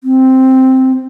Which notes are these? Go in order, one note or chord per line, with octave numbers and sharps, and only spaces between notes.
C4